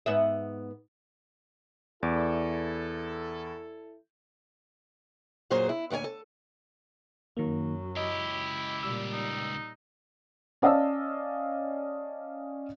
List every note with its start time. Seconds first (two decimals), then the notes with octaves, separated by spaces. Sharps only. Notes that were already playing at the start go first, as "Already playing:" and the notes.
0.06 G#2 B3 E5
2.03 E2 E4 A4 D5
5.50 F#2 A#2 F#3 G#4 C5
5.69 E4
5.90 D2 A#2 F4 C#5 G#5
6.04 A4
7.37 F#2 D#3 F#3 A#3
7.97 C#2 E4 G4 D#5
8.83 A#2 G3 E6
9.12 D#4
10.62 C#4 D5 D#5 F5 A5 E6